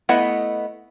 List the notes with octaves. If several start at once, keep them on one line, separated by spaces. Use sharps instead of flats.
A3 B3 E4 D#5 F#5